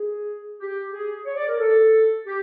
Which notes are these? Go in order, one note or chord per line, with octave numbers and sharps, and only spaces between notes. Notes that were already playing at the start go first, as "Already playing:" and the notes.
Already playing: G#4
G4
G#4
C#5
D5
A#4
A4
G4